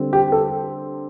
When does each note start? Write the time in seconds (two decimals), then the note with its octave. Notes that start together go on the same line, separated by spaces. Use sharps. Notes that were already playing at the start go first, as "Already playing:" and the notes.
Already playing: D3 G3 C4
0.13 G4
0.32 A4